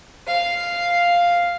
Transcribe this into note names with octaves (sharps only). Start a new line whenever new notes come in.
F5